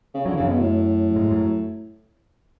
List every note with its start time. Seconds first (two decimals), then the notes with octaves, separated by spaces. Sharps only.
0.14 C#3
0.25 D3 F#3
0.33 E3
0.36 F#2 C#3 F#3
0.48 B2
0.59 A2
1.16 G#2 G#3
1.31 F#2 F#3